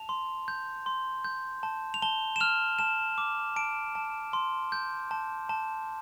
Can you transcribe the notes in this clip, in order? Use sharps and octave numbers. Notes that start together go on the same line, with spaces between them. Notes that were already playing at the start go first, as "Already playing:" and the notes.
Already playing: A5 F7
C6
G6
C6
G6
A5
F7
A5 G7
E7
F6 F7
A5 E7
D6
A5 D7
A5
C6
G6
A5
A5